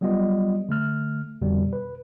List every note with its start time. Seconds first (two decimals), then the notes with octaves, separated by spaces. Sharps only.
0.01 F#3 G3 B3 F4 D#5
0.69 D3 A3 F6
1.42 F2 B2 D3 G3
1.73 B4